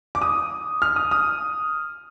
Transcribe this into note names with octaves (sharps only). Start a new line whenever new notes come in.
D6
D#6
F6
D#6
D#6